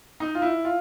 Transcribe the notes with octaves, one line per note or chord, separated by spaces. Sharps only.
D#4
F4
E4
F4